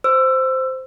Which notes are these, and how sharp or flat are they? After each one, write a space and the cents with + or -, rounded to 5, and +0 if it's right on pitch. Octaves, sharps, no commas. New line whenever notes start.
C5 -5 E6 +20